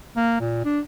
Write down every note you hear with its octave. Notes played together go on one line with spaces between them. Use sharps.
A#3
A#2
D4